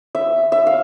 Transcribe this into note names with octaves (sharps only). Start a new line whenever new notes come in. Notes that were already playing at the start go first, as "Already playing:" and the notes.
E5
E5
F5